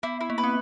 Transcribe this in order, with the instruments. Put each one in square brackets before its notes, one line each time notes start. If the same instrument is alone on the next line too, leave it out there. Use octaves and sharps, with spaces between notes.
[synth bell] B3 [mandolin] E4
[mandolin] E4
[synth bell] A#3
[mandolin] B4
[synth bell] C4